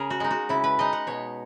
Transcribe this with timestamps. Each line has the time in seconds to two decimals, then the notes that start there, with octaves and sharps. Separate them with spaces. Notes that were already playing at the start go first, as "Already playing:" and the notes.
Already playing: C#3 G#4 A#4
0.10 F#4
0.20 G#3 D#4
0.31 F#4
0.49 C#3 E4
0.64 B4
0.79 G#3 D#4 D#5
0.93 F#5
1.07 B2 C#5